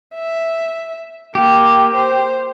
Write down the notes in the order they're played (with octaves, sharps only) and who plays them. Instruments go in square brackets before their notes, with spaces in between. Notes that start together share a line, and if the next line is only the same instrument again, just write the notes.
[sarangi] E5
[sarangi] A#3 [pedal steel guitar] G4
[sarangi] C5